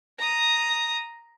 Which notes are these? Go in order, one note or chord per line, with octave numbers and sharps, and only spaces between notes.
A#5 D#6